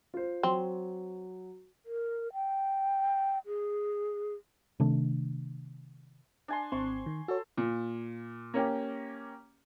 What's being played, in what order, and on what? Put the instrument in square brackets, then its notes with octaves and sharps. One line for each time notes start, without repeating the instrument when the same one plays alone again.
[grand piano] F4 C5
[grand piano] F#3 [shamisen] C4
[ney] A#4
G5
G#4
[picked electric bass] C3 D#3 A3 D4
[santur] D4 G#5 C6
[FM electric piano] G#1 C4 [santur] C6 C#6
[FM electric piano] D#3
[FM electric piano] F#4 C#5 [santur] A4
[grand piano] A#2
A#3 C#4 G4